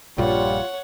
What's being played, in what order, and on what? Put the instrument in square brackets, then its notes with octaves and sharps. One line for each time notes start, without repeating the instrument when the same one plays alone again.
[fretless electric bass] A#1 G2 A#2 [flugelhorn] G3 [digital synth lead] F4 [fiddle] C#5 F#5